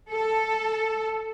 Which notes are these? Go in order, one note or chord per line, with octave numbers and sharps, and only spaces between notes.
A4